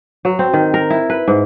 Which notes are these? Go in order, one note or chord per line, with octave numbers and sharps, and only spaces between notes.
F#3
C4
D#3
A#4
E4
B4
G#2